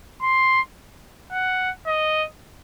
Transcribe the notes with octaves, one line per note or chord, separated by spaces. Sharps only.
C6
F#5
D#5